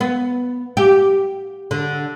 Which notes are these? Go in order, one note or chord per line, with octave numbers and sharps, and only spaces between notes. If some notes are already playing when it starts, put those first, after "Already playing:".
B3
G4
D3